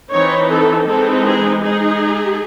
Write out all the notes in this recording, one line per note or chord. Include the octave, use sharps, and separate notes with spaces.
E3 C4 D#4 C#5
A4
E3 G#3 C4 D#4 A4
G#4
G#3 D#4 G#4